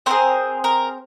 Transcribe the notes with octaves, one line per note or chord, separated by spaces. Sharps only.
C4 D#4 G#4 A#4 C5
A#4